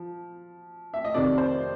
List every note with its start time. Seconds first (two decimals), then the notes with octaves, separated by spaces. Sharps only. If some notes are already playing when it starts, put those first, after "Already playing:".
Already playing: F3
0.94 E5
1.05 D#5
1.14 F2 C3 D#3 D5
1.38 C5